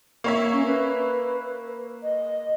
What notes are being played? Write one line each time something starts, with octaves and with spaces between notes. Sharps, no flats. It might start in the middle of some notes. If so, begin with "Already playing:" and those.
A#3 C#5 E5
C#4
B4
D#5